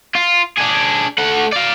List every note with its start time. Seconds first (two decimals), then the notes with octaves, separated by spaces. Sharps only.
0.15 F4
0.57 D4 G#4
1.18 A3 F#5
1.53 D5 F5